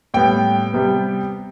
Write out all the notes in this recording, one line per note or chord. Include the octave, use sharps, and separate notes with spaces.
A2 G3 B3 G5
C3 G3 B3